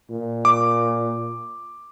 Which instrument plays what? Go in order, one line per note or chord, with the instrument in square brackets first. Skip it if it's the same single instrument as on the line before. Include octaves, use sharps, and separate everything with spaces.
[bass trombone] A#2
[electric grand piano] D6